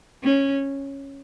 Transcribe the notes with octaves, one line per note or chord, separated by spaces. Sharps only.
C#4